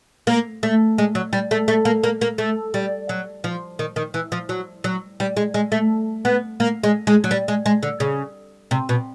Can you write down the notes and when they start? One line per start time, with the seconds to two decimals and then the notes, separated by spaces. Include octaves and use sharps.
0.27 A#3
0.63 A3
0.98 G#3
1.15 F#3
1.33 G3
1.51 A3
1.68 A3
1.85 A#3
2.03 A#3
2.21 A#3
2.38 A3
2.74 G3
3.09 F#3
3.44 F3
3.79 D#3
3.96 D#3
4.14 E3
4.32 F3
4.49 F#3
4.84 F#3
5.20 G3
5.37 G#3
5.54 G#3
5.72 A3
6.25 B3
6.60 A#3
6.84 G#3
7.07 G#3
7.24 F#3
7.31 G3
7.48 G#3
7.66 G#3
7.83 D3
8.00 C#3
8.71 C3
8.89 B2